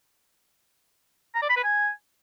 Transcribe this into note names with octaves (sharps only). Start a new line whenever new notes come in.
A#5
D5
B5
B4
G#5